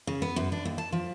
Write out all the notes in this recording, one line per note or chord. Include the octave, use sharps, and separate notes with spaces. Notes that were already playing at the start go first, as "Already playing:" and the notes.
C#3
B3
F#2
D4
D#2
A5
F3